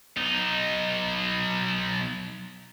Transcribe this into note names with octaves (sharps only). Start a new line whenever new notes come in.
B1 D#4